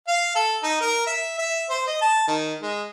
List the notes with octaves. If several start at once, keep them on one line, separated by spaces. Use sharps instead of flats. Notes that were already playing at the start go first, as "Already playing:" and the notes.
F5
A4
D#4
A#4
E5
E5
C5
D#5
A5
D#3
G#3